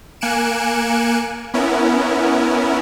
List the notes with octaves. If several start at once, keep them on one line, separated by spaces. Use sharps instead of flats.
A#3 G#5 F#6 C#7 D7 E7
B3 C#4 E4 A#4